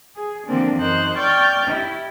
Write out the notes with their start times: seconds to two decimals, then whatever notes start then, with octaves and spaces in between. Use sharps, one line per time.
0.15 G#4
0.46 D3 F3 A#3 C4 D4
0.76 F#2 E3 D#4 A#4 C5 F#6
1.16 D5 G5 C#6 F6 G6 A6
1.65 E4 G4